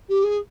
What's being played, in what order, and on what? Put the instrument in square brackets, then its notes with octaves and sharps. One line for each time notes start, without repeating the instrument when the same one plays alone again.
[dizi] G4
G#4